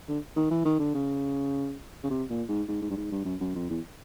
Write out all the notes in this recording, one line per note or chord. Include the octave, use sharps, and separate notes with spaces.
D3
D#3
E3
D#3
D3
C#3
C#3
C3
A#2
G#2
G#2
G#2
G2
G#2
G2
F#2
F#2
F2
E2